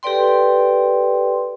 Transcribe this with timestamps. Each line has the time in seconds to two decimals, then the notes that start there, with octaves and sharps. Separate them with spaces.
0.03 G4 A4 B4 D5 G5 C6